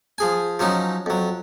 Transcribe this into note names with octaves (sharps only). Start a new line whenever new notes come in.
F3 G#4 G#5
F3 F#3 C#4 D#4
F2 F#3